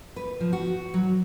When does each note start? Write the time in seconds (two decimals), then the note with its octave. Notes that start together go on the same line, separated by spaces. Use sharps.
0.16 B4
0.40 F3
0.53 F#4
0.94 F#3